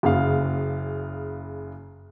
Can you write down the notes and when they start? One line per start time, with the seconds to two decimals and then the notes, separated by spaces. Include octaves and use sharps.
0.03 F#1 C#3 F5